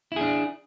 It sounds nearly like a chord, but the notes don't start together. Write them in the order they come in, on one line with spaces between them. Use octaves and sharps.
E4 G#4 D4